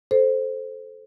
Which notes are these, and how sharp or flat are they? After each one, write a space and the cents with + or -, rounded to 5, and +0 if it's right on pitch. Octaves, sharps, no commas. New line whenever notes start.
A4 -15 C5 +0